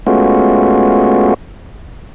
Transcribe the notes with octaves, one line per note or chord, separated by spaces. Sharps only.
G#3 A3 B3 C#4 F4 F#4